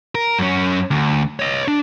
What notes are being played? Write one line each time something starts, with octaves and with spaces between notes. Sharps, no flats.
A#4
F#2 C#4
D2
C#5 D#5
D4